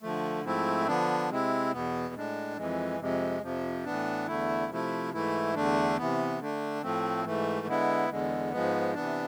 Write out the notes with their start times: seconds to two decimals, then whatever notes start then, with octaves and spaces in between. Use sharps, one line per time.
0.02 D3 F3 A3
0.44 G#2 F3 A3 C4 E4
0.87 D3 F3 B3 D4
1.29 C3 G#3 C4 E4
1.72 E2 B2 B3
2.14 A2 G#3 D4
2.57 F2 E3 G#3
3.00 F2 C3 G#3
3.42 F2 C3 F3
3.85 A2 E3 B3 D4
4.27 E2 D3 A3 E4
4.70 C3 F3 A3 E4
5.12 G#2 E3 A3 E4
5.55 E2 D3 A3 D4
5.97 C3 E3 B3
6.39 D3 A3 D4
6.82 A2 F3 A3 C4
7.25 G#2 E3 A3
7.67 D3 G#3 B3 E4
8.10 E2 D3 G#3
8.52 G#2 F3 G#3 B3
8.95 C3 E3 B3 D4